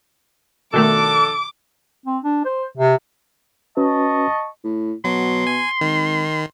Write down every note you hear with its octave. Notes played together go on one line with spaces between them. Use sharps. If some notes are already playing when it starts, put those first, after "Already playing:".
B2 D#3 F3 A3 D4 A4 D6
C4
D4
C5
C3
C#4 F#4 B4 D#5 A5 C#6
A2
B2 F#3 C6
G#5
G#1 D#3